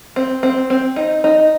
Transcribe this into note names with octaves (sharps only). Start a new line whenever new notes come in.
C4
C4
C4
D#4
D#4